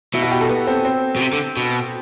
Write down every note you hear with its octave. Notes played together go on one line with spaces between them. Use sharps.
B2 E4
F#4
G4
A4
B3
C4
C4
B2
C3
D3
B2